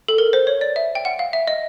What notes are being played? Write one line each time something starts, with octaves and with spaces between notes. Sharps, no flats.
A4
A#4
C5
C#5
D5
E5
G5
F#5
F5
E5
D#5